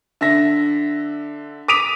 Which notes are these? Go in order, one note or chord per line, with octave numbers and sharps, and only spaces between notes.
D3 E5 A#6
D6 D#6 B6 D7 D#7 F7